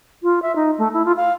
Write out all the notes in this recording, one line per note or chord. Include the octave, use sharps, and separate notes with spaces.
F4
E5
D#4
A3
E4
F4
F5